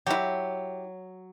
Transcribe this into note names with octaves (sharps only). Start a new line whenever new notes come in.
F#3 E4 G4